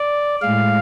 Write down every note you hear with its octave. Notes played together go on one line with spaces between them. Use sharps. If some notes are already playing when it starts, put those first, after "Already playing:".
Already playing: D5
A2 G#3 F5